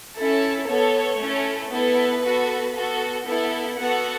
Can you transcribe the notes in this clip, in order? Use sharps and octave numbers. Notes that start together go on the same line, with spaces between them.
C#4 E4 A4
B3 A4 C#5
A3 C#4 E4 A4
B3 E4 A4 B4
B3 F#4 A4
B3 F#4 A4
B3 E4 A4
B3 F#4 A4 F#5